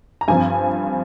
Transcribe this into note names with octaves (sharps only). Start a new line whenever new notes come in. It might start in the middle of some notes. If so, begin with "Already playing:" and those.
A#5
G2 F3 C4 G#5